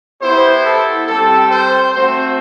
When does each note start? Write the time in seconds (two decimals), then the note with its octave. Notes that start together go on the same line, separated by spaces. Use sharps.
0.21 B3 E4 G4 C5
0.64 A4
1.07 G3 C4 G4 A4
1.51 C5
1.94 A3 C4 F#4 C5